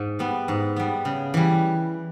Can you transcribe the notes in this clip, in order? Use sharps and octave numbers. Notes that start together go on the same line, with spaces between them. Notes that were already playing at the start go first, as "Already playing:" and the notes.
Already playing: G#2
G3 B3
G#2
G3 B3
C#3
E3 G3